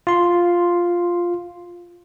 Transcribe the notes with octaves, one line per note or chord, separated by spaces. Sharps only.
F4 C6